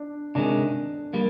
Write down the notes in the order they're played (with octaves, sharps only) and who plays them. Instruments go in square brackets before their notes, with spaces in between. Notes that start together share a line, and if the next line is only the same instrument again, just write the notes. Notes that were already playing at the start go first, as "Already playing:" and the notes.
Already playing: [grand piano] D4
[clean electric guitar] C3 D#3 G#3 C#4 [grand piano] D4
[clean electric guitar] G3 A#3